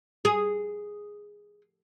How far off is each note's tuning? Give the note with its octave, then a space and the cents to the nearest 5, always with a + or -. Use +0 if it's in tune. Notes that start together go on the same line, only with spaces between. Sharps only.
G#4 -5